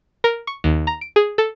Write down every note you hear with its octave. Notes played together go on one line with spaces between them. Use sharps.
A#4
C#6
D#2
A#5
D7
G#4
A4